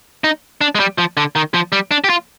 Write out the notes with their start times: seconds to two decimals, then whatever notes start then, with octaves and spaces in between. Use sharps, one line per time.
0.24 D#4
0.61 D4
0.75 G#3
0.80 G3
0.98 F3
1.17 D3
1.36 D#3
1.54 F3
1.72 G3
1.91 D4
2.04 G4
2.10 F4